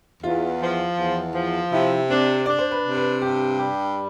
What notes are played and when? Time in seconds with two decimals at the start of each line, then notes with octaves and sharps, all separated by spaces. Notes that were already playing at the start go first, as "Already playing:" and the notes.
0.22 E2 F4
0.61 F3
0.97 E2
1.35 F3
1.72 C3 E4
2.10 C4 D4
2.46 D4 D5
2.59 C5
2.71 B4
2.85 C3
2.97 B4
3.21 G2 G4
3.59 G3 G4